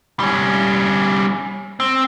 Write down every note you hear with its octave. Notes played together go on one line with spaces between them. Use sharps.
G3 C#4
C4